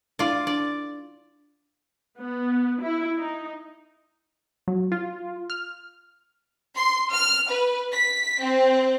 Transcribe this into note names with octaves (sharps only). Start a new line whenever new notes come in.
D4 E4 F4 D5
D4 D5
B3
E4
D#4
F#3
F4
F6
C6
F6
B4
B6
C4